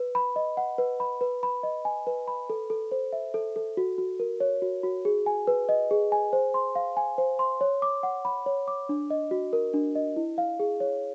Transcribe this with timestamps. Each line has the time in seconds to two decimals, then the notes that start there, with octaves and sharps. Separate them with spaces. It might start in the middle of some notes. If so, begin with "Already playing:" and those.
Already playing: B4
0.15 B5
0.36 D#5
0.57 F#5
0.78 B4
1.00 B5
1.21 B4
1.43 B5
1.63 D#5
1.85 G#5
2.07 B4
2.28 B5
2.50 A4
2.70 A4
2.92 C5
3.13 E5
3.34 A4
3.56 A4
3.77 F#4
3.98 F#4
4.20 A#4
4.40 C#5
4.62 F#4
4.83 F#4
5.05 G#4
5.26 G#5
5.47 B4
5.69 D#5
5.91 G#4
6.12 G#5
6.33 C5
6.54 C6
6.75 F5
6.97 G#5
7.18 C5
7.39 C6
7.61 C#5
7.82 D6
8.03 F#5
8.25 B5
8.46 C#5
8.68 D6
8.89 D4
9.10 D#5
9.31 F#4
9.53 A#4
9.74 D4
9.95 D#5
10.16 E4
10.38 F5
10.60 G#4
10.80 C#5